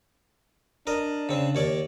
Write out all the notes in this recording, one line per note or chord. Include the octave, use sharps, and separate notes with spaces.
D4 A#4 D#5
C#3 C4
D#2 C#5 D5